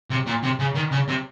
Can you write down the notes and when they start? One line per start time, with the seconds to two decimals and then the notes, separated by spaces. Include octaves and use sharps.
0.10 C3
0.26 A#2
0.43 C3
0.59 C#3
0.74 D#3
0.91 C#3
1.08 C3